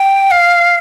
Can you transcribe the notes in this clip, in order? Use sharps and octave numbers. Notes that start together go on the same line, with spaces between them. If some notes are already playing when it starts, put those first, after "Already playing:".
Already playing: G5
F5